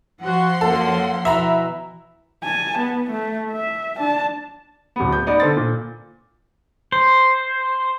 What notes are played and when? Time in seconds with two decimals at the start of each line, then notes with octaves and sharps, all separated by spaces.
0.24 F3 F#4 F#5 C6
0.61 F#2 A#3 A4
1.25 B2 E3 E5 A#5 B5
2.44 G#5 A5
2.79 B3
3.11 A3
3.52 E5
3.98 D4 A5
4.96 D1 B3
5.12 G6
5.27 B3 D#4 D5
5.40 D3 A4 C5 A6
5.57 A#2
6.92 C5